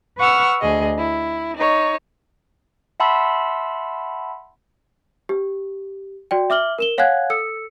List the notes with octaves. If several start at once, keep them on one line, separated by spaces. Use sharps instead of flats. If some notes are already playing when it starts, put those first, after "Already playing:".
B4 F#5 C#6 E6 F6
D2 G#4 D#5
E4
D#4 C#5
E5 F#5 A5 B5 C6 E6
G4
F#4 D5 G5
E5 D6 F6 F#7 G7
A#4 E7 G7
C#5 F5 F#5 G#5 F#6 G#6
A4 E6 C#7